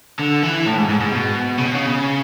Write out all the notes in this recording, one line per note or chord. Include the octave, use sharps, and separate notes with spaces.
D3
E3
A2
G#2
G#2
G#2
B2
C#3
B2
C#3